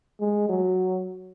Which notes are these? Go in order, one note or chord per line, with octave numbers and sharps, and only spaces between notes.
G#3
F#3